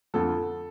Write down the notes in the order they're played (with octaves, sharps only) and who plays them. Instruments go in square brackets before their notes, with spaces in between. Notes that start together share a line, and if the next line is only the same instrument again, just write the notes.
[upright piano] F2 D3 F3 A4